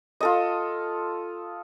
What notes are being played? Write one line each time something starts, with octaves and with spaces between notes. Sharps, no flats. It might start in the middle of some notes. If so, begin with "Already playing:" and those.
F4 A4 D#5